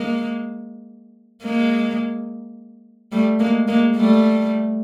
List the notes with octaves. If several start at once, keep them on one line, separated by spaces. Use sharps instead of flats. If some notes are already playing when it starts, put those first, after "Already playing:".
Already playing: G#3 A#3
G#3 A#3
G3 A3
G#3 A#3
G#3 A#3
G3 A3